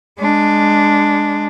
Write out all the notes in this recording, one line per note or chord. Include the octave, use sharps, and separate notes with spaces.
G#3 D4